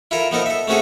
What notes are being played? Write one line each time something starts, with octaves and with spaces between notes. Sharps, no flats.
E4 F4 A4 A#4
F3 B3 D#4 A4 A#4
A4 E5
A3 C4 C#4 F#4 G#4 A4